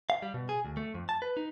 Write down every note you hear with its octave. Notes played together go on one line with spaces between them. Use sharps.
F5
G3
B2
G#4
D2
A3
F2
A5
B4
D#4